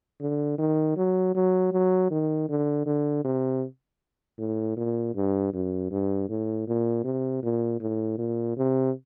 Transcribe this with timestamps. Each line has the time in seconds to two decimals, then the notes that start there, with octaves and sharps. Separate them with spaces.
0.21 D3
0.58 D#3
0.97 F#3
1.35 F#3
1.72 F#3
2.11 D#3
2.49 D3
2.86 D3
3.25 C3
4.39 A2
4.77 A#2
5.15 G2
5.53 F#2
5.91 G2
6.29 A2
6.67 A#2
7.04 C3
7.43 A#2
7.81 A2
8.18 A#2
8.57 C3